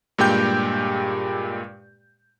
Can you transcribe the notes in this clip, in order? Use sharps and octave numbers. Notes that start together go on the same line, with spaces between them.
G2 A#2 G#3 G4 G5 G6